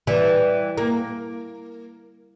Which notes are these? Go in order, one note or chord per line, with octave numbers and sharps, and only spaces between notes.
E3 G3
A#3